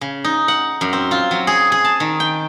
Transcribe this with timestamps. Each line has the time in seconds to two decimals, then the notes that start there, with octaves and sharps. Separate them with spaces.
0.01 C#3
0.24 D#4
0.48 F#5
0.81 F#2
0.93 C4
1.11 F4
1.31 F#3
1.47 G#4
1.72 G#4
1.85 A5
2.00 D#3
2.20 G5